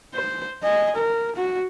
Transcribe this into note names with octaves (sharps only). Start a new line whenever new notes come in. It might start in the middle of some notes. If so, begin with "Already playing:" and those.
C5
D#5 G#5
A#4
F#4